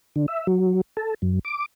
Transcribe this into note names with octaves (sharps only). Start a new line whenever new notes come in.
D3
E5
F#3
A4
F#2
D6